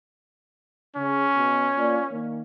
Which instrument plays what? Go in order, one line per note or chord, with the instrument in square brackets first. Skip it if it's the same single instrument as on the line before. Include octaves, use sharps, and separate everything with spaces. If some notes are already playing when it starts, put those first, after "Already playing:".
[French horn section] C#3 [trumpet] C#4
[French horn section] B2
A#3 F4 D5
D#3 A#3